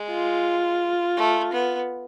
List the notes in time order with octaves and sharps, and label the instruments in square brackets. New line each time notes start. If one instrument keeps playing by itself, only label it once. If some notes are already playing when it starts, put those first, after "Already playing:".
Already playing: [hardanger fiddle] G#3
[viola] F4
[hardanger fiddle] A3
B3